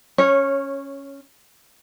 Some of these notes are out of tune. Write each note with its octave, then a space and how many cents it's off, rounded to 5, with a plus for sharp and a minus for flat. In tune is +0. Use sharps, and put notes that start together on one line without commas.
C#4 +0 C#5 -15